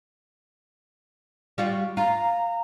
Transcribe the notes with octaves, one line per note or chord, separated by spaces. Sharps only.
G3 F4 F#4
F4 A#5